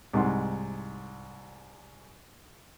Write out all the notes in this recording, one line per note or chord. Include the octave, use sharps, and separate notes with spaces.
C2 G#2 D#4 F#5 C6